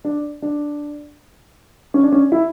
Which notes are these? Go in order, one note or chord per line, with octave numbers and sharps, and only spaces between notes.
D4
D4
C#4
D4
C#4
E4